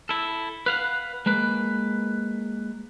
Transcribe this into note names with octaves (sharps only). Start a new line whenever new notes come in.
E4 A4
B4 F5 F#5
G#3 A#3 B4